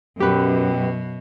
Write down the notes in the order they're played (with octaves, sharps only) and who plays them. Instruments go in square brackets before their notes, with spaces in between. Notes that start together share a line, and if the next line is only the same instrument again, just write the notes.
[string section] F#2 [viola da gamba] B2 [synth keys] G4 B4